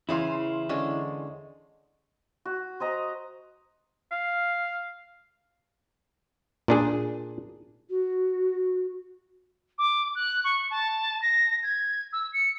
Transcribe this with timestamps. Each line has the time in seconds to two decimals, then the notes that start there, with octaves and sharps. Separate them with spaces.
0.09 E2 C#3 E4 G#4 F5 C6
0.69 D3 G#3 C#4
2.45 F#4
2.80 C5 D#5 A#5
4.12 F5
6.68 A#2 D4 G#4
7.90 F#4
9.78 D6
10.15 F#6
10.44 C#6
10.70 A5
11.22 A#6
11.63 G#6
12.13 E6
12.33 C#7